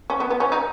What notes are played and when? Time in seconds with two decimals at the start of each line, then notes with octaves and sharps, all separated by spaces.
0.10 C#4
0.20 B3
0.30 B3
0.40 C#4
0.52 D#4